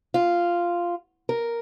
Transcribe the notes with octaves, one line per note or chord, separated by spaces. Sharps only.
F4
A#4